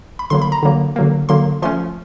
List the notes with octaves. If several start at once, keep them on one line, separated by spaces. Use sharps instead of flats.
B5
D3 F#3 A#3 C6
B5
A#5
D3 F#3 A#3
D3 F#3 A#3
D3 F#3 A#3 C6
F3 A3 C#4 C6